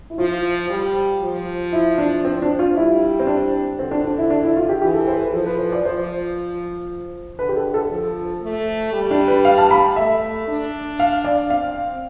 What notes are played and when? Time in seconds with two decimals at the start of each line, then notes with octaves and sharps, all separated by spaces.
0.10 E4
0.18 F3 F4
0.70 G3
1.22 F3
1.73 E4
1.98 D4
2.25 C4
2.42 D4
2.59 F4
2.76 G3 E4
3.20 C4
3.27 D4
3.79 D3 C4
3.91 D4
4.04 D4
4.18 E4
4.30 D4
4.44 E4
4.56 F4
4.69 G4
4.81 E3 G4
4.94 A4
5.08 C5
5.20 B4
5.33 F3 A4
5.46 B4
5.59 C5
5.72 D5
5.85 F3 C5
7.39 D3 B4
7.49 G4
7.56 A4
7.74 A4
7.90 F3
8.42 A3
8.93 G3
9.11 D4
9.28 B4
9.45 F5
9.58 A5
9.71 B5
9.96 A3 E5
10.48 D4
10.99 F5
11.25 D5
11.50 C4 F5